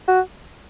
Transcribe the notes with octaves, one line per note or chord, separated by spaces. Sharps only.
F#4